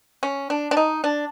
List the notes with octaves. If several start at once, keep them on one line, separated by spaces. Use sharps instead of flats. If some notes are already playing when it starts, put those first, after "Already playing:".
C#4
D4
D4
D#4
D4